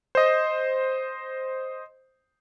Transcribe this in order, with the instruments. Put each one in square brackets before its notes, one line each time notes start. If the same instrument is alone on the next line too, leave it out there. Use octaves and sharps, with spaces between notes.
[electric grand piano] C5 D#5